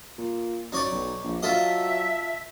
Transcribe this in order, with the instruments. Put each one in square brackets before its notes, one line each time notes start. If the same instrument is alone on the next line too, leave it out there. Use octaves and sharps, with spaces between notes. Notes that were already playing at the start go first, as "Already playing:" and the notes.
[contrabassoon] A#2
[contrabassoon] F#2 [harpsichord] D#4 C#5 D5
[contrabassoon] B1
A#1
[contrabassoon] F#3 [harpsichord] F4 A4 D#5 [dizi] E5